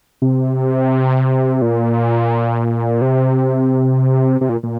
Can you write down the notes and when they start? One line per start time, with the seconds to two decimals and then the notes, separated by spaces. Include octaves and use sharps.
0.22 C3
1.62 A#2
3.01 C3
4.41 C3
4.49 A#2
4.63 A#2